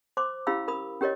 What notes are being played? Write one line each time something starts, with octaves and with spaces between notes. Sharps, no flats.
C5 C6 D6
C#4 E4 G4 F5 B5 E6
A#4 B5 D#6
C#4 G4 A#4 C#5 D#5